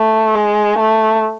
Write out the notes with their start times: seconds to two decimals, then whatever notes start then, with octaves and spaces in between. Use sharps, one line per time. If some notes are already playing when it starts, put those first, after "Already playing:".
Already playing: A3
0.35 G#3
0.79 A3